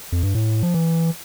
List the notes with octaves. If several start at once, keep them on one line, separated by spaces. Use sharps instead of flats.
F2
G2
A2
F3
E3